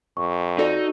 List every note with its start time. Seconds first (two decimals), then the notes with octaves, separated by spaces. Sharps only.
0.17 F2 C#6
0.59 D#4 F#4 A4 D5